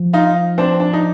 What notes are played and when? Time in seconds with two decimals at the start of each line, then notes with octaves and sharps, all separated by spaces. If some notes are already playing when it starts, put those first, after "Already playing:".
Already playing: F3
0.13 D#4 F4
0.58 C4 D4
0.80 D4
0.93 D#4